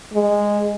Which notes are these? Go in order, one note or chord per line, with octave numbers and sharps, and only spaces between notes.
G#3